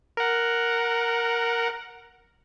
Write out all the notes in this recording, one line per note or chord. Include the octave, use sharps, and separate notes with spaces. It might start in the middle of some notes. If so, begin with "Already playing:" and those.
A#4 F#5